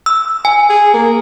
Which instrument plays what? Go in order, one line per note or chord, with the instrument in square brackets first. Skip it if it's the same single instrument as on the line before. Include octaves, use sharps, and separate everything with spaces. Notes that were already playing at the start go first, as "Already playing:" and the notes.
[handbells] E6
G#5
[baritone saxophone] G#4
A#3